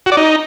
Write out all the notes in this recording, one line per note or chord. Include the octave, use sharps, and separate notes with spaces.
F#4
D5
D#4